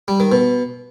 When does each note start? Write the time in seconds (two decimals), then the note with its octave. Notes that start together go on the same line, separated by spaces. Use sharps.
0.08 G3
0.20 D#3
0.32 B2